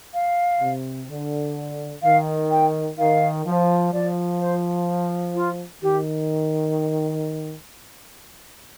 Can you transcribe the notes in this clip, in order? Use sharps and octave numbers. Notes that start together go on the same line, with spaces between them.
F5
C3
D3
D#3 F5
G5
D#3 F5
F3
F3 D5
C5
F4
D#3 G4